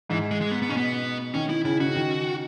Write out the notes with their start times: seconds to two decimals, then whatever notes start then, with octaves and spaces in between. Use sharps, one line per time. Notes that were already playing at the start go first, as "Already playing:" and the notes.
0.10 G#2 E3
0.31 G#3
0.41 G#3
0.51 B3
0.62 B3
0.69 B2 C#4
0.77 B3
1.34 D#3 C#4
1.49 E4
1.65 C#3 E4
1.80 C#3 F#4
1.96 D#3